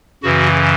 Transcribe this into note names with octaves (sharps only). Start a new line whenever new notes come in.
F#2 C#3 E3 F#4